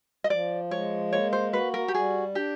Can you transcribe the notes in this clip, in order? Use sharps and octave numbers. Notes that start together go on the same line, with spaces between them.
D#5
F3 D5
G#3 C#5
A#3 C#5
C5
F#4 B4
A#4
G4
G3 G#4
D4 G4